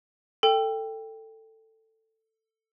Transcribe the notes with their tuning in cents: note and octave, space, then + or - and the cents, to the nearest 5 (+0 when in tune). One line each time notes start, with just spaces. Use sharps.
A4 +15 G5 +5